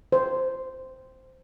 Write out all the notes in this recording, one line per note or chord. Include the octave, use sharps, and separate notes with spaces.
C5